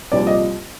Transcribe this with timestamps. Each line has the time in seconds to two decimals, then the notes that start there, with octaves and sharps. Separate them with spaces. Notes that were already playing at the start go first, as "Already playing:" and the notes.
0.12 C2 A#2 F3 D5
0.27 D#5